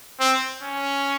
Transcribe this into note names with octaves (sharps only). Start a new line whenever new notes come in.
C4
C#4